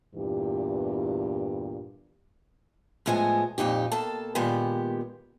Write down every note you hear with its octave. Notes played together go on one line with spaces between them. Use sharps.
E2 G2 A#2 E3 G4
A2 F3 G#3 B3 G#5
F2 A#2 D#4 G4
B2 A#3 A4 A5
A#2 D#3 G#3 B3 G4